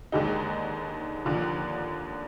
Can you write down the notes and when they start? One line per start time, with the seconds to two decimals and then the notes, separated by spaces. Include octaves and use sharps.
0.12 D#2 D3 G#3 D#4
1.25 D#2 D3 F3